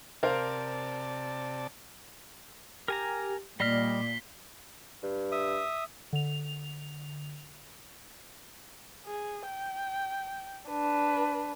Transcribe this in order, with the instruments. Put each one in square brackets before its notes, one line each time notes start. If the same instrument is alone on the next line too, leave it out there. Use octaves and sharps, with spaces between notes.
[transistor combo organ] C3 D5 A5 [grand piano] A#4 C5 F5
[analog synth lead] G4 [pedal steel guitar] A#4 G#5 A#5
[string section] A#2 [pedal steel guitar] G3 D#5 F6 [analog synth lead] D5 [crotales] B6 C7 G7
[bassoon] G2
[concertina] E5 D#6
[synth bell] D3 F7
[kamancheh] G#4
G5
D4 B4